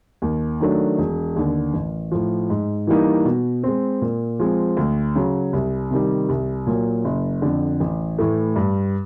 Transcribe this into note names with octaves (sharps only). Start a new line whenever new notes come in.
D#2
D#3 F#3 A3 D4
E1
D#2 D3
A1
A2 F3
G#2
E3 G3 A#3 D#4
B2
G#3 C4
A#2
F3 G#3 C4
D2
C#3 F#3
C2
C3 D#3 G3
C2
A#2 F#3
F#1
F2 D3
A1
A2 E3 A3
G2